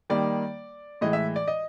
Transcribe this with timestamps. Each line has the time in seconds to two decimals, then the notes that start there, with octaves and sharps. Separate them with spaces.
0.10 D#3 G3 A#3 D5
1.01 A2 E3 G#3 D#5
1.13 E5
1.36 D5
1.48 D#5